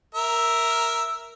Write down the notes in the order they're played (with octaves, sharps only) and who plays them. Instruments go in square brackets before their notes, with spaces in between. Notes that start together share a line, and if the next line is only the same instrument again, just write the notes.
[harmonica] A#4 E5